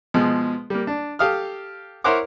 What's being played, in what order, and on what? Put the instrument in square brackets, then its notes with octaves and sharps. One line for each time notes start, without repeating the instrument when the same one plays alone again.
[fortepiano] B2 F3 G#3
G3 A#3
D4
G4 A4 F5 D#6 F6
E4 A#4 C5 C#5 F#5 D6